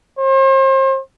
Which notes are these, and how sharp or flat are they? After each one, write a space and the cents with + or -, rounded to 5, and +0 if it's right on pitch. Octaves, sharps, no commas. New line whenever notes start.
C5 +40